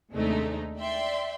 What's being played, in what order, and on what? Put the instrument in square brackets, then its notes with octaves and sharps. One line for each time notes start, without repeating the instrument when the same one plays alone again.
[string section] D#2 C3 G#3 A3 D4 D#4
D5 E5 G5 C6